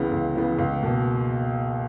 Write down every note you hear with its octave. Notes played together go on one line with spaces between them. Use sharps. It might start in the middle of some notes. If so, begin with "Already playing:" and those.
Already playing: C#2 C#3 E3 B3
C#2
C#3 E3 B3
C#2
B2 A#3